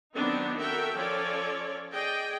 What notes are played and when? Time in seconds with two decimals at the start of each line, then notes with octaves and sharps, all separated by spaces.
0.13 D#3 F#3 B3 C4 D4 D#4
0.58 F#4 A4 A#4 E5 G5
0.96 F3 C#4 A4 C#5 D5
1.92 G#4 D5 D#5 G5